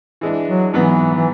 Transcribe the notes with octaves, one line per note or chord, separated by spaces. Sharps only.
E3 G#3 D4
F#3
G#2 E3 F#3 B3
E3